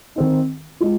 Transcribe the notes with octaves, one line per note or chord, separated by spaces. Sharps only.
D#3 C4 D#4
G#3 F4